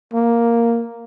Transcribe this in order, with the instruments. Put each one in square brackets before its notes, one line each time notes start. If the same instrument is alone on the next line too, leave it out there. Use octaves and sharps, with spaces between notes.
[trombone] A#3